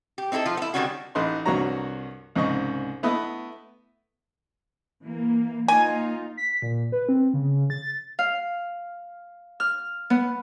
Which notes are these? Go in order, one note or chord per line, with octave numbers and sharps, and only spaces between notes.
G4
C4 D#4 E4 G4 A4
F3 F4
B3 E4
D3 D#3 G3 C4 C#4 F#4
A1 D#4 B4 C6
C2 G2 F#4 C#5 A#5
C2 G#2 C#3 D#5 C#6
A3 B3 E4 B4 D#5
E3 A#3
A#3 D#4 F4 G#5
B6
A#2
B4
C4
C#3
A6
F5
F6
B3